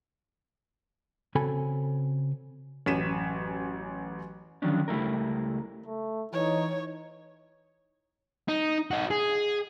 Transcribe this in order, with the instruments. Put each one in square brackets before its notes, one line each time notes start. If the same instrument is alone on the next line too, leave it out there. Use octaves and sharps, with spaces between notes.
[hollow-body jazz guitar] C#3 C4 F#4 A4 G#5 B5
[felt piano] A1 F#2 C#5 B6 D#7 E7
[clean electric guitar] D3 D#3 F3 F#3 C#4 D4
C#2 G3 A3 E4 A#4
[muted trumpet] A3
[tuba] E3 [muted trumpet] D#4 [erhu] C#5
[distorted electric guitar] D#4
D#4 F#4
G#4